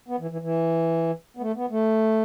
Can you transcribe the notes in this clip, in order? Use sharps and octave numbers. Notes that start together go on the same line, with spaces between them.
B3
E3
E3
E3
B3
A3
B3
A3